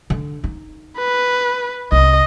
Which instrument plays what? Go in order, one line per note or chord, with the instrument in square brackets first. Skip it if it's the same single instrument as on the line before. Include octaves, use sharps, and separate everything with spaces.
[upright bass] D3
D#4
[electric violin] B4
[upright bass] C2 [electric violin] D#5